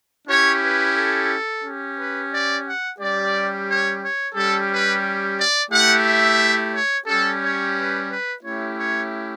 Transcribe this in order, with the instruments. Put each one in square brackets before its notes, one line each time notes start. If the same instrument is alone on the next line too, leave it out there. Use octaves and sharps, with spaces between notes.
[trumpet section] C#4 E4 G4 C#5
B4
A4
C#4 G4
B4
D5
F#5
G3 C#4 G4 D5
C#5
C#5
G3 C#4 G4 A4
B4
D5
A3 E4 G4 F#5
E5
C#5
G3 C#4 G4 A4
C#5
B4
B4
A3 C#4 E4 G4 C#5
C#5